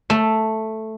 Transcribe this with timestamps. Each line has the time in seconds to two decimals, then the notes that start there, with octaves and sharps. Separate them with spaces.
0.10 A3